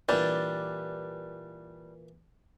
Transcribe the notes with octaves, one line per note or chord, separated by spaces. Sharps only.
A#2 E3 G3 D4